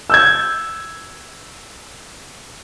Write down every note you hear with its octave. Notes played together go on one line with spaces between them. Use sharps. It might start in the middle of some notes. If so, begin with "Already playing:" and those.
E6 G6 G#6